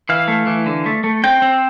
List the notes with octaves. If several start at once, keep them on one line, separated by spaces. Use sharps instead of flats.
E3 F5
A3
E3
D3
A3
A3
C4 G5
C4